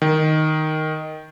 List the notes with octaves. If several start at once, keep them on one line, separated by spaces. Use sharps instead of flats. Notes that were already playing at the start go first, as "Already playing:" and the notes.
D#3